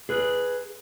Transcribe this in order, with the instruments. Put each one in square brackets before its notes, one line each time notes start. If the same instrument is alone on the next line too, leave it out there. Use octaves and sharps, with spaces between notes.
[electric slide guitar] G#4 B4